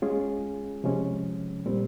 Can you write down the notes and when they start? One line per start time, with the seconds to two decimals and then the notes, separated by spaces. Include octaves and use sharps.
0.02 G#3 C#4 F4 G#4
0.84 C3 F3 G#3 C#4
1.66 A#2 G3 C4